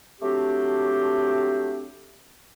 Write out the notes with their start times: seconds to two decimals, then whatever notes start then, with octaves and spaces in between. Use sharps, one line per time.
0.21 F#3 A3 C4 D4 G4